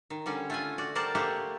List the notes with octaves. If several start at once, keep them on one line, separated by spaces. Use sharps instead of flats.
D#3
D3 G3 C#4
A3 F4 G#5
F#4 D5
G3 A#4 C5 D5 F#5 A5
A3 A#3 G4 C5 F#5